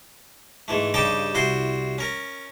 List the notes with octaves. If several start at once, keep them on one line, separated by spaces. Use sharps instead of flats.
G#2 E3 A3
G2 C#3 D#4 G4 G5 A5
C2 E4 F#4 C5 C6
C#4 A#4